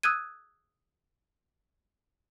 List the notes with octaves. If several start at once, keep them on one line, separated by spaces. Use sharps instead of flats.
D#6 E6 F#6 G#6 D#7